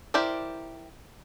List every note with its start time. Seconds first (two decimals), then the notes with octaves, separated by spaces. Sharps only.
0.14 E4 G4 A#4 C5 D5